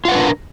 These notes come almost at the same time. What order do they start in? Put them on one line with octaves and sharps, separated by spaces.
F4 F#5 B4 D4 A#4